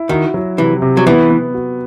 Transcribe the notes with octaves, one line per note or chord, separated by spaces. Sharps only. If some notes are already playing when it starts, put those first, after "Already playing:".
Already playing: E4
D#3 F#4
F#3
C3 E3
C3
F#3
E3 B3
B3
F#4